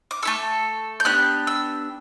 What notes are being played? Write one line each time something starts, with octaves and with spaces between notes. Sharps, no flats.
D6
A3 E4 A4 E6
G6
B3 D4 G4 F#6
E6